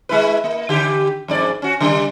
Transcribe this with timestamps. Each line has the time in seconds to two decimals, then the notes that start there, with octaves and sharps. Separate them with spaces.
0.09 G#3 E4 B4
0.44 A#3
0.69 D3 G4
1.28 F2 G#2 D5
1.62 C#4 F#4
1.80 C#3 G3